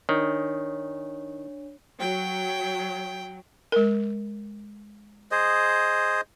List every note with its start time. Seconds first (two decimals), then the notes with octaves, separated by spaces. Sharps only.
0.09 D#3 D4 C#5
2.00 F#3 G5
3.72 G#3 A#4
5.31 G#4 C5 D#5